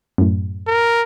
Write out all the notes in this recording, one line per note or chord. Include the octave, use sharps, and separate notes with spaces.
F#2 A2
A#4